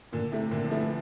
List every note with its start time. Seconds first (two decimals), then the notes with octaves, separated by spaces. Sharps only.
0.12 A#2 D3
0.32 C3 A3 E4
0.51 A#2 D3
0.65 F3
0.70 E3 A3 E4